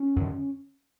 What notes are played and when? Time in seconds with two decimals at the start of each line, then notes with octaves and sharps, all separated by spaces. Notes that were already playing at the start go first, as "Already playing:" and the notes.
Already playing: C#4
0.16 F#2 D3